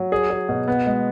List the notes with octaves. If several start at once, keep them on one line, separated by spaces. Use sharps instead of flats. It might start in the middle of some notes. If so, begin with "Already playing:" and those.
Already playing: F#3
G#4
G#4
B2
B3
G#3